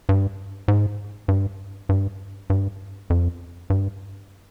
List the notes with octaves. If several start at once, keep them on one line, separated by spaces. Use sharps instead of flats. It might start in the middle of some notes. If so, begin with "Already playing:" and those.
G2
G#2
G2
G2
G2
F2
G2